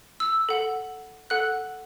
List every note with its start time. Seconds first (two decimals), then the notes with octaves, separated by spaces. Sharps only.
0.20 E6
0.49 A4 F#5
1.30 A4 F#5 F#6